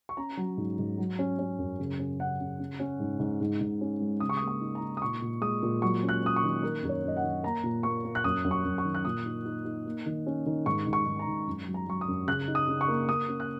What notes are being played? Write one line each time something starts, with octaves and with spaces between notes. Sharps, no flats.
C#6
C#4 A#5
F#3
G#2
G#2
F#3
C#4
C#4
F#2
C#3
C#4
C#3 F#5
C#3
C#4
C#4
G#2
G#2
G#2
G#2
C#4
G#3
C#3 D#6
C#6
D#6
A#3
C#6
D#4
A#5
D#4
D#6
A#2 C#6
A#2
G#3 D#6
A#2
F#3 C#6
C#4
F#6
C#4 D#6
C#6
D#3
A#3 A#4
F#2 A#4
C#5
F#2 D#5
F#5
D#3
A#3 A#5
A#2
A#3 C#6
A#3
F#6
F#2 D#6
F#2
C#6
F#2
C#6
D#3
F#6
A#2 D#6
D#4
D#4
D#4
A#3
D#3
C#4
D#3
G#2 C#6
G#2
C#6
G#2
A#5
G#2
F#2
F#3
A#5
F#3 C#6
D#6
F#2
C#3 F#6
D#4
D#6
C#3
C#6
A#3
A#3 D#6
C#4
F#6